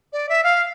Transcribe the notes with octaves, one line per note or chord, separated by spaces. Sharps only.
D5
E5
F5